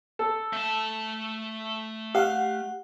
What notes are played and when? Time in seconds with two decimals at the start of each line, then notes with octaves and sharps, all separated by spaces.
0.19 A4
0.53 A3 A5
2.15 G4 F5 F#5